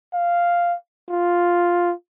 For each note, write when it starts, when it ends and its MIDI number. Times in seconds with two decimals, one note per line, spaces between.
0.14 0.75 77
1.10 1.93 65